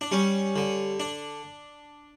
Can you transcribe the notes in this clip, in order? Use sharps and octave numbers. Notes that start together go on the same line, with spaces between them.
D4
G3 C#4
D3
D4